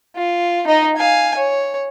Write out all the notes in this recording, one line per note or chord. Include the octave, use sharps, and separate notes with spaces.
F4
D#4 D#5
F5 G#5
C#5